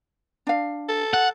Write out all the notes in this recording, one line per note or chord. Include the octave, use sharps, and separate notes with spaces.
D4 F5
A4
F#5